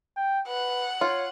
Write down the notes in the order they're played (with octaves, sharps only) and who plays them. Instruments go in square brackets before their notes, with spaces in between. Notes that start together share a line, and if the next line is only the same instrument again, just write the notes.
[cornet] G5
[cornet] B4 [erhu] F#5
[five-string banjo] F4 [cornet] C#5